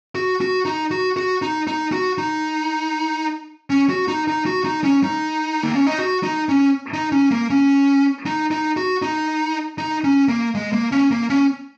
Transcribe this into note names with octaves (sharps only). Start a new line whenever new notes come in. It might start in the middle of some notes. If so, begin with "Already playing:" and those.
F#4
F#4
D#4
F#4
F#4
D#4
D#4
F#4
D#4
C#4
F#4
D#4
D#4
F#4
D#4
C#4
D#4
A#3
C#4
D#4
F#4
D#4
C#4
D#4
C#4
A#3
C#4
D#4
D#4
F#4
D#4
D#4
C#4
A#3
G#3
A#3
C#4
A#3
C#4